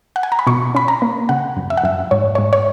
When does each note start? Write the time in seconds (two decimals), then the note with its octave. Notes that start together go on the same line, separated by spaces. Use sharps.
0.16 F#5
0.23 G#5
0.32 A#5
0.39 B5
0.47 B2 C#6
0.75 C#4 B5
0.88 A#5
1.02 A#3
1.29 C#3 F#5
1.57 F#2
1.70 E5
1.77 F#5
1.83 F#2 E5
2.11 G#2 C#5
2.35 G#2 C#5
2.53 C#5